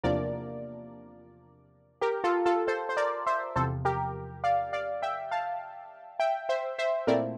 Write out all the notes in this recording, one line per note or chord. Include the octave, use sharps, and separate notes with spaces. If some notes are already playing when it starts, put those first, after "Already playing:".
E2 C3 F3 A#3 D4 A#4 D5
G4 A#4
F4 A4
F4 A4
A4 C5
C5
A#4 D5
C5 E5
E2 C3 F3 A4 C5
G4 A#4
D5 F5
D5 F5
E5 G5
F5 A5
E5 G5
C5 E5
C5 E5
A#2 A3 C4 E4 A#4 D5